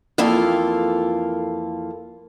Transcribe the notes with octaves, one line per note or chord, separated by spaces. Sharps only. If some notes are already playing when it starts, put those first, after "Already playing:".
F2 E3 A#3 F4 A4